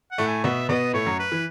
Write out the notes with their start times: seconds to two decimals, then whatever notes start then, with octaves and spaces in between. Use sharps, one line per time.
0.11 F#5
0.18 A2 A3
0.27 G#5
0.44 B2 B3 E5
0.69 B2 B3 D#5
0.93 A2 A3 C#5
1.06 F#2 F#3
1.19 B4
1.32 E3